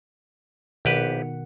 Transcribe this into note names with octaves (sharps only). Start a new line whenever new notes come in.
A#1 B2 D#3 G4 B4 F#5